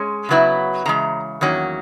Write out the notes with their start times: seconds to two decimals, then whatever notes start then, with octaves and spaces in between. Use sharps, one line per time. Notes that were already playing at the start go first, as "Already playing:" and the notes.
Already playing: G#3 C#4
0.29 C#3 F#3 B3 E4
0.86 C#3 E3 G#3 A#5
1.41 E2 D#3 F#3 A#3 C#4